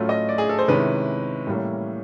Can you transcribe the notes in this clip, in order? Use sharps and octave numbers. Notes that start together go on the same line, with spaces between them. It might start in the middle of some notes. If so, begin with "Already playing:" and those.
Already playing: A2 F#3 A3 C#4 F4
D#5
D5
G#4
A4
C5
C3 D#3 G#3 C#4 E4 B4
A2 E3 G3 A#3 C#4